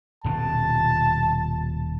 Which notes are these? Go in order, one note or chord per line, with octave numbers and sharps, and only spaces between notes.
D#1 B2 A5